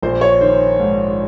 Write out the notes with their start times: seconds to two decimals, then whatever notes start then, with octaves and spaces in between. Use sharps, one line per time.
0.02 A#1 C5
0.21 C#5
0.41 D#3 C5
0.80 G#2